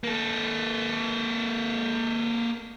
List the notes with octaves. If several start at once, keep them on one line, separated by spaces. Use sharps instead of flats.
A#3 A4